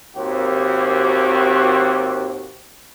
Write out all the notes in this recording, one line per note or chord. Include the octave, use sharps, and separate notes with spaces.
G#1 D#2 C4 F#4 G4